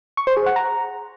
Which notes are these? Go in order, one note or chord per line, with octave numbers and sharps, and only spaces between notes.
C#6
C5
G#4
F#5
A#5